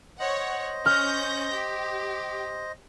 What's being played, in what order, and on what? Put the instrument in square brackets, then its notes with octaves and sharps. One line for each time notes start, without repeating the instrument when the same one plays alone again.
[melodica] C5 D#5 [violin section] C#5 F#5
[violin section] C#4 G6 A#6 [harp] F6
[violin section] G4